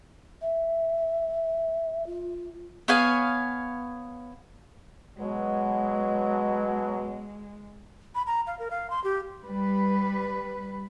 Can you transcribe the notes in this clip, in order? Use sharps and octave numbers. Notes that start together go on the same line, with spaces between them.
E5
F4
B3 C#5 F5 G#5
B2 F#3 G#3
B5
A#5
F5
A#4
F5
C6
G4
G3 B4